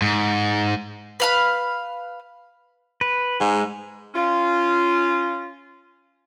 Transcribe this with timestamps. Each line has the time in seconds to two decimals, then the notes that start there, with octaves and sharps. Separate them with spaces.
0.02 G#2
1.20 B4 F5 B5
3.01 B4
3.41 G#2 G#3
4.15 C#4 F4